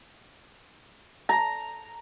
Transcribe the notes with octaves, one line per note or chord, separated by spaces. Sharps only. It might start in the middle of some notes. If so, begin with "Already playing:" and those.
A#5